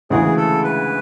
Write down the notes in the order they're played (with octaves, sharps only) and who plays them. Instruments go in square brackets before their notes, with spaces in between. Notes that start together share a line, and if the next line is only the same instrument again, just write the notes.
[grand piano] D2 C#3 E3 G#3 [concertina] G#4
[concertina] A4
B4